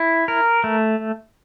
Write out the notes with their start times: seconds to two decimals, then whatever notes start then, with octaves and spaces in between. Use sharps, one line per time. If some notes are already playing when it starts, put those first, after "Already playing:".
Already playing: E4
0.28 A#4
0.64 A3